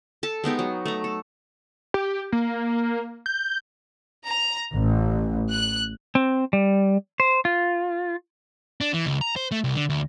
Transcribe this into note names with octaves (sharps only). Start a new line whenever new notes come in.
A4 A5
G#3 B3 D#4 G4
F#3
A3 A#5
A4
G4
A#3
G6
A#5
A1
F#6
C4
G3
C5
F4
D4
E3
C#2
A#5
C5
A3
C2
D3
D2